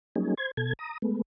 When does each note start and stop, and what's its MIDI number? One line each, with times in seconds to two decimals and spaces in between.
0.16 0.34 54
0.16 0.34 55
0.16 0.34 58
0.16 0.34 61
0.16 0.34 63
0.16 0.34 68
0.37 0.51 72
0.37 0.51 92
0.57 0.73 47
0.57 0.73 69
0.57 0.73 92
0.79 0.98 82
0.79 0.98 87
1.02 1.22 56
1.02 1.22 57
1.02 1.22 59